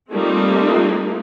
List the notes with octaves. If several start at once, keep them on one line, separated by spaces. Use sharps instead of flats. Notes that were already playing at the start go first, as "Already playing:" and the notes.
G3 A3 A#3 C4 D#4 F4